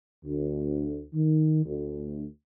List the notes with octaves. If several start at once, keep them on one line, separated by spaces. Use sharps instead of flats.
D2
D#3
D2